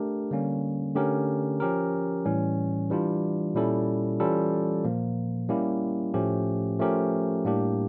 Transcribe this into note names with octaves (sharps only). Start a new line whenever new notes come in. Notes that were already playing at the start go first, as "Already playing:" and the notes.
Already playing: A3 D4 G4 A#4
D3 G3 A#3 C#4
D3 A3 C#4 G4 A#4
F3 C#4 G4 A#4
A2 E3 G3 C#4
E3 G3 D4 F4
A#2 G3 C#4 E4 A4
E3 G3 C#4 F4 A4
A#2 F3 A#3
G3 A#3 C#4 E4 G4
A2 F3 A3 C#4 G4
F3 A3 C#4 G4 A#4
A2 G3 A#3 D4 G4